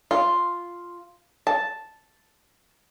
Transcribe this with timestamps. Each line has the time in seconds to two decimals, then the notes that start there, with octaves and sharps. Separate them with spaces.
0.11 F4
1.47 A5